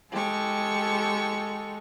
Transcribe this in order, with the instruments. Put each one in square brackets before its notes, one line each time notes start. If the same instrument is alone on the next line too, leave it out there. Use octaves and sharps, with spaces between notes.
[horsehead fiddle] G#3 A4 [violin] G4 C#6